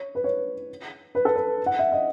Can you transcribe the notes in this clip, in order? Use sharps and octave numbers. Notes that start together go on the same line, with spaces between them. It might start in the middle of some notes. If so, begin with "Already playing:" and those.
Already playing: C#5
B4
C#5
B4
A4
B4
F#5
E5
D#5